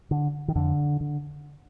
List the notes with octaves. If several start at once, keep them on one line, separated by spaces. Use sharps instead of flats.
D3
D#3
F2 D3
D3